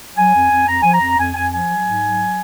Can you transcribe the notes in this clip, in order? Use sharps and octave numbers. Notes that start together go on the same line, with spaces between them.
F#3 G#5
F2
F2
F2 A#5
F3 G#5
A#5
F2
F2 G#5
F2 G#5
F3 G#5
F#3
G#2
F#3